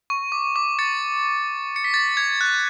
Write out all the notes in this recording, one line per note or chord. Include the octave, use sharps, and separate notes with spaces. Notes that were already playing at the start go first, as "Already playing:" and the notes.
C#6
D6
D6
A6 C#7
C#7
B6
A6
G#6
F#6